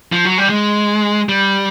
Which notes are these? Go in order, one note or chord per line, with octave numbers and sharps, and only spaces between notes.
F3
F#3
G3
G#3
G3